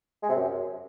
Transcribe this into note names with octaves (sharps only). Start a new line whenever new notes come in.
G#3
C3
F#2